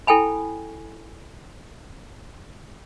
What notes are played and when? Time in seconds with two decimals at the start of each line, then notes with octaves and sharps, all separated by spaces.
0.07 E4 A4 G5 G#5 B5